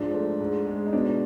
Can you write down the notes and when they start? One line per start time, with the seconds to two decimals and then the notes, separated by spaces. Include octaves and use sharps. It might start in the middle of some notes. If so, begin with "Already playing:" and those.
Already playing: G#2 F3 D4
0.14 A3
0.40 G#2
0.66 G#3
0.86 D#4
0.93 B2 D4